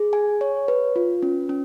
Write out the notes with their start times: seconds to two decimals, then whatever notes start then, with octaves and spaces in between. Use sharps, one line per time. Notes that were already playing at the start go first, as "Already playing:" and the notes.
Already playing: G#4
0.13 G#5
0.41 C#5
0.68 B4
0.96 F4
1.23 C#4
1.49 C#4